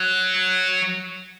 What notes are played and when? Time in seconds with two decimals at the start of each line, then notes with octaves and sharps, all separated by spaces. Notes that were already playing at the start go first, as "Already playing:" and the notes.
Already playing: F#3